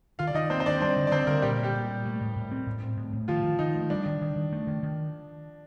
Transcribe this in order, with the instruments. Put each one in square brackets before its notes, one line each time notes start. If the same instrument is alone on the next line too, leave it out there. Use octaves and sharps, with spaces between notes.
[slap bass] D#3 [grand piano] F4 F5
[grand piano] D5
[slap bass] D#3 [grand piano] D#4 D#5
[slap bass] A#3 [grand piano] C4 C5
[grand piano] C5
[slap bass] D#3 [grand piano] D4 D5
[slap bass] G3 [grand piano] C4 C5
[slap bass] D3
[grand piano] D5
[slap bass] D3 [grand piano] C4 C5
[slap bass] D3 [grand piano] A#3 A#4
[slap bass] A#2 [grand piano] G3 G4
[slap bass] A#2
[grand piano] G3 G4
[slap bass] A#2
A#2
A3
A2
A2
C4
A2
C4
A2
A2
[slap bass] D#3 [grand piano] F3 F4
[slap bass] D#3
[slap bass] D#3 [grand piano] D#4
[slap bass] A3
[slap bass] G3 [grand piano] D4
[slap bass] D#3
D#3
D#3
A3
D#3
D#3